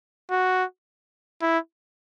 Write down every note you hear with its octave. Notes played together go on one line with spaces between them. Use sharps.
F#4
E4